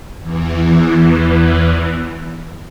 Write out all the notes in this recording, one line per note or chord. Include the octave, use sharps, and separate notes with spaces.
E2 E3